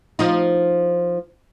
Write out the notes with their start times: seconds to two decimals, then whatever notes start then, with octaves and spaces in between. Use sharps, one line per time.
0.19 F3 D#4